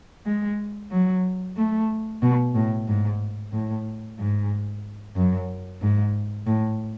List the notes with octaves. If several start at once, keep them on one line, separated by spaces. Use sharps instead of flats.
G#3
F#3
A3
B2
A2
G#2
A2
G#2
F#2
G#2
A2